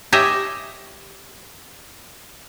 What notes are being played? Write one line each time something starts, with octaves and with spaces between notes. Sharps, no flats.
G4 C#5 D#5 E5 G#5